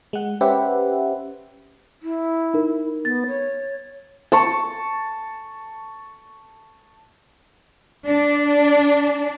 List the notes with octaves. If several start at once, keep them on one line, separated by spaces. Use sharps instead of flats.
G#3 F#5
C#4 G4 B4 C5 E5 F#5
E4
D#4 A#4
B3 A6
C#5
A5 C#6
D4